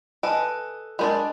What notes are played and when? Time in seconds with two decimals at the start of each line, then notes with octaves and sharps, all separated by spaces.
0.23 A4 B4 D#5 G#5
0.99 G#3 D4 F4 A#4 D5 D#5